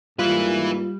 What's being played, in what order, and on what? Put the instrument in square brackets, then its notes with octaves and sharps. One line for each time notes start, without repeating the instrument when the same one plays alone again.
[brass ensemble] G#2 A#3 [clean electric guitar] G3 [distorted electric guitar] E4 B4 [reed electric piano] F4